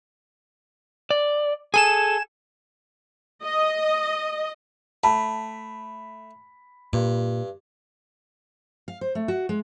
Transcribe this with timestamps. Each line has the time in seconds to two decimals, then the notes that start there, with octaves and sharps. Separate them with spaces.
1.11 D5
1.74 G#4 A4 G#5 E7
3.43 D#5
5.04 A3 A5 B5
6.93 G2 A#2
8.88 F5
9.01 C5
9.15 A3
9.28 F#4
9.49 G#3